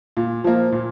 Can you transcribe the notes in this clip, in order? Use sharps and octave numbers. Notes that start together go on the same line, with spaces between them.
A#2
F3 A#3
A#2